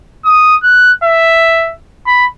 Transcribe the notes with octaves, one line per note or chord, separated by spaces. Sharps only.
D#6
F#6
E5
B5